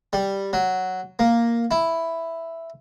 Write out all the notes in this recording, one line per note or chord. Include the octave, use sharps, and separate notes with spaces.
G3
F#3
A#3
E4